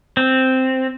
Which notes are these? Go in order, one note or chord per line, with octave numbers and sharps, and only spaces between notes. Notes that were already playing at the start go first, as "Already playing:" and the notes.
C4